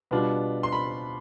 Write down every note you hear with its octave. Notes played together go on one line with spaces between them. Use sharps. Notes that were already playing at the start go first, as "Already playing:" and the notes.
B2 G3 B3 D4 F4
C6
B5